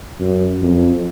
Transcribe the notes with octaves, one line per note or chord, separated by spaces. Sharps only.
F#2
F2